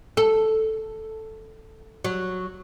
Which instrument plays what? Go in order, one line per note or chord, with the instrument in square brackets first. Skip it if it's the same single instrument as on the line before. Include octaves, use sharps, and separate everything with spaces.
[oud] A4
F#3